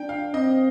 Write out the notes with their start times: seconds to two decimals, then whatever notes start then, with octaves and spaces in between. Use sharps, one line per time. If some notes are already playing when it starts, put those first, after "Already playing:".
Already playing: D4 G5
0.09 F5
0.33 C4 D#5